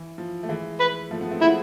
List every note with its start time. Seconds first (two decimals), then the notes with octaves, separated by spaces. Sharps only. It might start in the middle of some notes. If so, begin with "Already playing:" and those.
Already playing: E3
0.18 F3
0.43 A3
0.48 E3 G#3
0.80 B4
1.11 F3 A3
1.21 G#3 B3
1.31 A3 C4
1.41 G#3 B3 E4